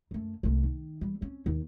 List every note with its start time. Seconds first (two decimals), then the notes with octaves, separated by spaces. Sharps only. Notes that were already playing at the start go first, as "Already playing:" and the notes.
0.11 F#2 A3
0.43 C2 A3
0.63 D#3
1.01 E3 G3
1.21 C4 C#4
1.46 D#2